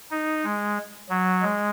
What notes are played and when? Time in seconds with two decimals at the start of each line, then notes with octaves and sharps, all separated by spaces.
0.11 D#4
0.44 G#3
1.09 F#3
1.42 G#3